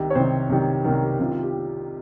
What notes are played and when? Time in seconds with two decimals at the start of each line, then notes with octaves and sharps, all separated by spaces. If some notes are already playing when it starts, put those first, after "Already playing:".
Already playing: C2 C3 D#3
0.10 C#5
0.15 C2 C3 D#3 C5
0.49 C2 C3 D#3
0.84 C2 C3 D#3 A#4
1.02 G4
1.19 C2 C3 D#3 F4
1.32 F4
1.43 G4